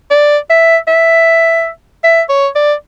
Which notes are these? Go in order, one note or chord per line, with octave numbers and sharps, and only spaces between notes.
D5
E5
E5
E5
C#5
D5